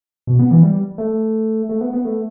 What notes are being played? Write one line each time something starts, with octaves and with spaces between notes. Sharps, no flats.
B2
B3
E3
G3
A3
A3
B3
B3
A3